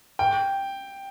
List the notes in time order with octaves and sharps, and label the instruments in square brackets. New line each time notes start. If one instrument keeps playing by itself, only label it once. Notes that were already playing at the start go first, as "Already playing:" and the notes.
[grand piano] G5